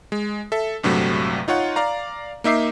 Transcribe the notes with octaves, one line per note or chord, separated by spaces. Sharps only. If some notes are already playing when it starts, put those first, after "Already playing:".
G#3
A4 E5
A#1 G2 C3 F#3 A3
D#4 F4 C#5 F#5
D5 F5 A#5
A#3 D#4 E5 D6 C7